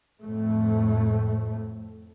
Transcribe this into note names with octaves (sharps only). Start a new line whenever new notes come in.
F2 A2 A3